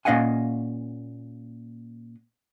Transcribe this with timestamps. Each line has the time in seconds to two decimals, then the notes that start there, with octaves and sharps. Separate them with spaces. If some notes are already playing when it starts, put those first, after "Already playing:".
0.05 A#2 C#4 D#5 F5 F#5 G#5